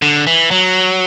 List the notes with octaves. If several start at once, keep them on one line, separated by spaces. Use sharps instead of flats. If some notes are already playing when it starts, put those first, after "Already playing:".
D3
E3
F#3